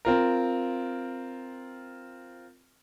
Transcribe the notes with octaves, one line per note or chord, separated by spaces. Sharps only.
C4 F4 A#4